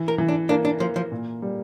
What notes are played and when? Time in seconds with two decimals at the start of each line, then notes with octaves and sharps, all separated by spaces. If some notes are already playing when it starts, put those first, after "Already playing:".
Already playing: E3
0.08 A#4
0.18 E3
0.28 D4
0.49 A#3 D4
0.65 D4
0.80 F3 A#3
0.96 F3
1.11 A#2
1.42 G3